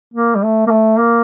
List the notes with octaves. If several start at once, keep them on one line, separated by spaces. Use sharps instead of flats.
A#3
G3
A3
A#3
A3
A#3